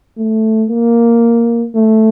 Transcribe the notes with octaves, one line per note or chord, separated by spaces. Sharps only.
A3
A#3
A3